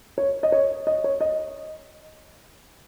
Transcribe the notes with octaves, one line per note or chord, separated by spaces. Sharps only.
C#5
D#5
C#5
D#5
C#5
D#5